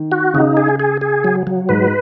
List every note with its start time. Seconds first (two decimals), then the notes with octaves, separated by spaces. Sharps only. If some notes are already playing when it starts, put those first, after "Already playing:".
Already playing: D#3
0.12 F#4
0.34 C#3 D#4
0.57 G#4
0.80 G#4
1.01 G#4
1.24 F#3
1.47 F#3
1.69 G#2 B4